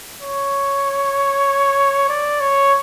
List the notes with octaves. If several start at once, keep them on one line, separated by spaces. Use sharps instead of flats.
C#5
D5
C#5